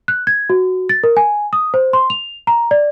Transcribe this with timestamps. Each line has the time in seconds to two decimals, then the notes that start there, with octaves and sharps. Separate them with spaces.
0.08 F#6
0.27 G#6
0.50 F#4
0.89 A6
1.03 A#4
1.17 G#5
1.53 D#6
1.74 C5
1.93 C6
2.10 F7
2.47 A#5
2.71 D5